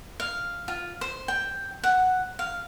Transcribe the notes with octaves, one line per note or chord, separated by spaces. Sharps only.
F5
F4
C5
G5
F#5
F5